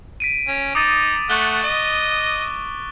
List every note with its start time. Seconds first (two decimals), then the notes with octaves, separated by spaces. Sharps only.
0.20 B6 D7 D#7
0.48 C#4
0.75 D#4 D6 D#6 A6
1.30 A3 F#5 C#6 F#6 G7
1.63 D#5